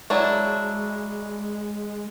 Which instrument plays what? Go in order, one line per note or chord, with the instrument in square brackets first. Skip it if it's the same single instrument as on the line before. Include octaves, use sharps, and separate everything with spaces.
[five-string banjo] F#3 D4 E4 [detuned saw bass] G#3